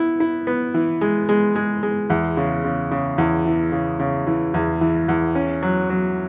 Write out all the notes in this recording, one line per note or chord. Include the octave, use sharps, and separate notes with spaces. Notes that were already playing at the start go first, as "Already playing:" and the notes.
Already playing: B3 E4
E4
B3
E3
G#3
G#3
G#3
G#3
E2
C#3
C#3
C#3
E2
E3
C#3
C#3
E3
E2
E3
E2
C#4
F#3
F#3